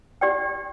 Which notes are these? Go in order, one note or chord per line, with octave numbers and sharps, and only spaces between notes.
G4 D5 G5